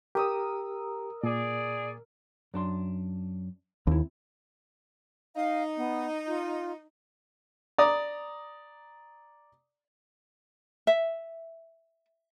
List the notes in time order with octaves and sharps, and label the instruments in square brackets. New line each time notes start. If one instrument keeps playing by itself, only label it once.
[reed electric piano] G4 [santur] A#4 D#6 E6
[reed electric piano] A#2 [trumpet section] G#4 D5
[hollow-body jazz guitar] F#2 D4 C6
[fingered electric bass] D#2 [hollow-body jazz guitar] C4 E4
[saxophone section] D#4 [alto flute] F5
[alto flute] B3
F4
[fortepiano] D5 A#5 D6 D#6
[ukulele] E5